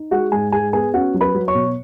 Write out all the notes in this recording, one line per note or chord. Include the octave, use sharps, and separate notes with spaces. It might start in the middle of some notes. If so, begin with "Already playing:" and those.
Already playing: D#4
G#3 F#4 F#5
G#2 G#4 G#5
G#3 G#4 G#5
B3 G#4 G#5
C#4 F#4 F#5
F#3
B4 B5
F#3
C#5 C#6
B2